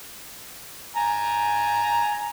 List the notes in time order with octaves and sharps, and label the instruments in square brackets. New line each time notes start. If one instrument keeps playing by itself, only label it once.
[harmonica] G#5 A#5